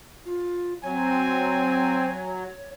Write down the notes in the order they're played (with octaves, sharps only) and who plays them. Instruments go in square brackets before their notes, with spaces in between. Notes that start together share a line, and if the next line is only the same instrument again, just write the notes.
[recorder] F4
[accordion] F#3 [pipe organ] C4 [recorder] C#5 [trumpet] G#5